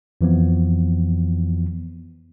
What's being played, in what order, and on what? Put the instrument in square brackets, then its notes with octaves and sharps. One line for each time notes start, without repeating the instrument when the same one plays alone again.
[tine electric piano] F2 E3 F3 B3